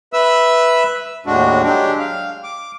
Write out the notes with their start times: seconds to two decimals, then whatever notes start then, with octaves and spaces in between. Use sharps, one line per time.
0.13 B4 E5 E6
1.26 D#2 A2 G#3 D4 F#4
1.64 F#3 G#3 D4 G4
1.99 F5
2.44 D6